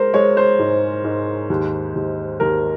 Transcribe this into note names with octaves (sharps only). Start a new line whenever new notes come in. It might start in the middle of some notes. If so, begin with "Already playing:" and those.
Already playing: G#3 A#4 C5
G#3 C#5
C5
G#2
G#2
D#2
D#2
D#2 A#4